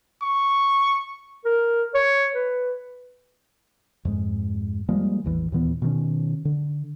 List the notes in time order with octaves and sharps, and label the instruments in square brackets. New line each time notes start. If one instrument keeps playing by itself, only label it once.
[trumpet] C#6
[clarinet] A#4
C#5
B4
[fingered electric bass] F2 G#2 G#3
F3 G3 G#3 A#3
A1 E2 E3
D#2 A#2 E3 B3
B2 D#3 C#4
D3